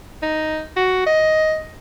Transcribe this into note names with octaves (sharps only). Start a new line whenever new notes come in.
D#4
F#4
D#5